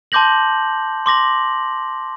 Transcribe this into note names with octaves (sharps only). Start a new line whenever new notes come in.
A5 C6 D6 G6 A#6 F#7
C6 D6 A#6 F#7